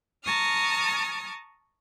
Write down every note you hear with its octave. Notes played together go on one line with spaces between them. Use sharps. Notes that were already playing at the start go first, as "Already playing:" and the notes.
A5 A#5 C#6 D#6 F6